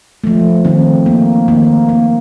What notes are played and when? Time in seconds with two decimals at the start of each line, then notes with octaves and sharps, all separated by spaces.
0.24 F3 A3
0.64 D#3 C4
1.06 A#3
1.48 D#3 A#3
1.89 A#3